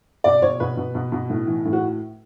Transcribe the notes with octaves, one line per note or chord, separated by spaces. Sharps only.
B2 D5
B2 C#5
B2 B4
B2
B2
B2
A2
E3
A2
F#4